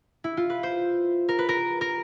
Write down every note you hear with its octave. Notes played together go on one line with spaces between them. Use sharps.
E4
F4
B4
C5
A#4
B4
A#4
A#4